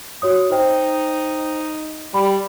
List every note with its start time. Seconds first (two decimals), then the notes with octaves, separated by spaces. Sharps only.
0.22 F#4 C#5 D#6
0.51 D#4 C5 G5
2.14 G3 B5